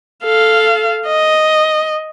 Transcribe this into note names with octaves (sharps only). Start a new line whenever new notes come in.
A4 F5
D#5